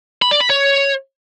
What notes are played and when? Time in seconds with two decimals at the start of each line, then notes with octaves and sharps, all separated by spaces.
0.22 B5
0.31 D5
0.40 B5
0.50 C#5